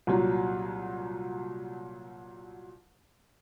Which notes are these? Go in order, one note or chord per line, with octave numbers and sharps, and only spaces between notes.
C2 A#2 F#3